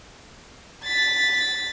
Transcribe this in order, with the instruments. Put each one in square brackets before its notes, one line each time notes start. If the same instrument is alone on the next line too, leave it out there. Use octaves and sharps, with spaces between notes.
[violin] A6 B6